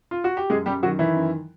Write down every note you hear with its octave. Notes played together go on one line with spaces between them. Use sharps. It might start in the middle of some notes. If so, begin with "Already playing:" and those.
F4
F#4
G4
F#2 G#3 G#4
F#2 G3 G4
D#3 F#3 F#4
D#3 E3 E4
F#2